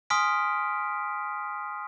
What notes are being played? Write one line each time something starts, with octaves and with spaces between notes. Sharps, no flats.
G#5 C6 D#6 F6 B6 D7